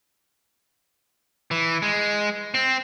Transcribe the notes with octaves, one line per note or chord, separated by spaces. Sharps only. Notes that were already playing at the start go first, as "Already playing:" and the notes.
E3
G#3
C4